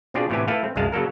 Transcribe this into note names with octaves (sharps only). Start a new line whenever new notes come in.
B2 C4 D4 F4 G4 G#4
A2 C3 E3 B3 G4 G#5
A3 E4 A4 B4 F5 G5
C4
C2 F#2 G#3 G#4 F5 A5
C#3 F#3 A#3 A4 A#4